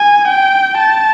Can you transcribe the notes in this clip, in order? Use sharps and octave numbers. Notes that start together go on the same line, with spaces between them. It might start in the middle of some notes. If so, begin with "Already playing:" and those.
Already playing: G#5
G5
A5